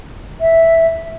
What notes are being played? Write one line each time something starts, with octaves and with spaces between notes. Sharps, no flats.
E5